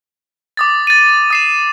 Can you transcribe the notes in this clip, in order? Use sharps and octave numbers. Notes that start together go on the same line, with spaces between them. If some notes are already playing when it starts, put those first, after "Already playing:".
D6 D#6 A6
A6 D#7
D#6 C7 E7